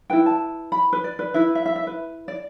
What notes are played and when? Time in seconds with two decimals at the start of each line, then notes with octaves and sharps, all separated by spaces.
0.10 E4 B4 G5
0.26 A5
0.72 B5
0.93 B4
1.04 D5
1.19 B4
1.34 E4 B4 E5
1.55 E5
1.66 E5
1.76 E5
1.87 B4
2.28 D5